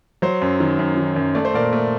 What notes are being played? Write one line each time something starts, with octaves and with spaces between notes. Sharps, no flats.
F#3 C5
F#2
D#3
F#2
D#3
F#2
A3 D5
C5
A#2 A#4 D5
A3